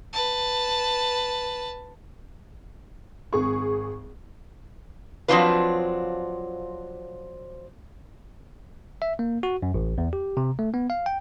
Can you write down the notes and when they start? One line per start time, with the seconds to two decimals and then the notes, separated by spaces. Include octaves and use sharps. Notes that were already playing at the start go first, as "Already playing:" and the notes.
0.13 B4 A5
3.33 G#1 G#4 C#6
5.28 F3 F#3 C4 D4 F4 B4
9.02 E5
9.19 A#3
9.43 F#4
9.62 F#2
9.74 A1
9.98 E2
10.13 G4
10.37 C3
10.59 A3
10.74 B3
10.90 F5
11.06 G5